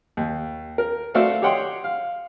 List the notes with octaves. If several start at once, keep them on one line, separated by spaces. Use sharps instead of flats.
D#2
A#4
A3 F#4 C5 D5 E5 F5
G4 C#5 D#5 F#5 G5 C6
F5